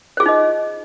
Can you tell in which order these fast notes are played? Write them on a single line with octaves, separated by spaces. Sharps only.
C5 G#4 F4 D#4 D#5